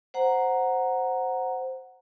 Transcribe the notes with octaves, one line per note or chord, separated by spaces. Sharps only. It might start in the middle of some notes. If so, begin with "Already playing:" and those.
C5 F#5 A#5